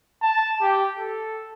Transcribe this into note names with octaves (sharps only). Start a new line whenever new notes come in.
A5
G4
A4